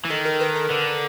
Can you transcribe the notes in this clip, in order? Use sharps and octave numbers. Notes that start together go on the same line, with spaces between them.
E3
D#3 A4
A#4
B4
A#4
D3